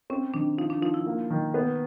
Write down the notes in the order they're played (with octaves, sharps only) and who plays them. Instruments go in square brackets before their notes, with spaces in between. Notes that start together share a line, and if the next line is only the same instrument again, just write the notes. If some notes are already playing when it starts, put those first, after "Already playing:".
[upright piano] C4 [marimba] C#4
[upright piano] D#3 [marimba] D4
[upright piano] F3 [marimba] D#4
[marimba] D4
[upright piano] F3 [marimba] D#4
[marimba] E4
[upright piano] A#3
D#3
B3